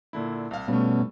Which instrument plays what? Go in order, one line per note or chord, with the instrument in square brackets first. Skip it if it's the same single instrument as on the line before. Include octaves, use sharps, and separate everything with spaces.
[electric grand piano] A#2 D3 E4
C2 F5
[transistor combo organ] B2 C#4 [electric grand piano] G3 A3